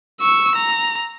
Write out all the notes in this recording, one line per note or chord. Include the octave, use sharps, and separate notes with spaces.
C#6 E6
A#5